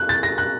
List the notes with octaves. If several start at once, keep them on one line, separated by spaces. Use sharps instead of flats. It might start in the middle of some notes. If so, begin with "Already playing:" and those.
Already playing: F#6
A6
A#6
F#6